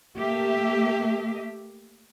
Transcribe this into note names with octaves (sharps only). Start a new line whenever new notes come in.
A3 A#3 G4 E5